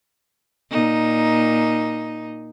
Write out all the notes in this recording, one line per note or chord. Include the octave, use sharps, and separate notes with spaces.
A#2 D#4